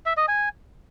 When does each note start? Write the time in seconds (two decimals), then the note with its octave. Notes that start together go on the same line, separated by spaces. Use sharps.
0.06 E5
0.17 D#5
0.28 G#5